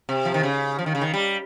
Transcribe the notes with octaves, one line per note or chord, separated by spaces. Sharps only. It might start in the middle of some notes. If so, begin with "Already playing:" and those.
C3
F3
D#3
C#3
F3
D#3
C#3
D#3
G3